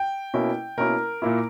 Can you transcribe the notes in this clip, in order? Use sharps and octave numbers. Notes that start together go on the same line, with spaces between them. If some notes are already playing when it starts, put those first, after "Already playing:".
Already playing: G5
B2 A#3 C#4 E4
B2 A#3 C#4 E4 A#4
A#2 A#3 E4